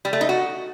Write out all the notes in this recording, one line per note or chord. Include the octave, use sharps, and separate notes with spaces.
G3
A3
D#4
F#4